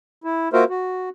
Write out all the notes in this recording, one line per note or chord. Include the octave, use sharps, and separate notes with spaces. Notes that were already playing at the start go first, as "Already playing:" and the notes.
E4
A#3 F4 F#4 A#4 C5 E5
F#4